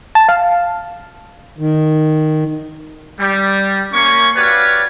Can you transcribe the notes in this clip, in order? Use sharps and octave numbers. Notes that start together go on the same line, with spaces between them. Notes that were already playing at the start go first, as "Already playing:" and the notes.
A5
F5
D#3
G3
A#3 C#4 C#6
F#4 G4 B4 C#5 D5 F5